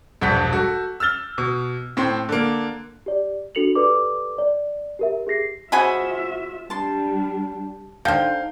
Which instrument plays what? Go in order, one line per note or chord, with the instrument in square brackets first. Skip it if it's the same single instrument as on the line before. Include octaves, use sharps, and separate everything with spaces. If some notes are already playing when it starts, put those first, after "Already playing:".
[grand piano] E1 A#1 G2 F#5 G6 B6
F#4 A4
E6 F6 A6 G7
B2
A2 C4 C6
D3 A#3
[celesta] G4 D5
D4 F#4 A4 C#7 F7 F#7
G4 A4 B4 D5 D6
D5
G4 A#4 E5
G4 G#4 A#6 C7
[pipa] C#3 G#5 B5 [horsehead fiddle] F4 E5 [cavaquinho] F#4 C5 D#5
[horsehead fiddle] G3 D4 [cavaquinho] A5 C6
[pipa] D3 C5 [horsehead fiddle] D#4 [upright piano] F5 G5 G6